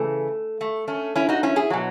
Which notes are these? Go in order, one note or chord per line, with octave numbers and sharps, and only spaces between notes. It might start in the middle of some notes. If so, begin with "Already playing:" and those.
Already playing: C#3 E3 A3
A3
A3 C#4
C#4 E4
D#4 F#4
C#4 E4
E4 G#4
B2 F#3